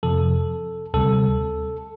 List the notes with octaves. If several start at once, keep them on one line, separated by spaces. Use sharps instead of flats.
F2 C3 F3 A4
D2 C3 G3 A4